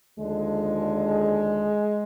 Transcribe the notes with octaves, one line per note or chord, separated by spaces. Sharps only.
D#2 D3 F3 G#3